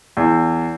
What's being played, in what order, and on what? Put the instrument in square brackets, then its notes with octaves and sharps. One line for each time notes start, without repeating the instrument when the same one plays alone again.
[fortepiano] E2